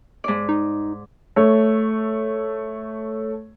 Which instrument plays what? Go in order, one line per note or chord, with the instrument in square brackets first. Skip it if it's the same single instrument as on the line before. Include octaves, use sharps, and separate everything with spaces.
[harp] G#2 D5
[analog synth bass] D#4
[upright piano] A3 C#5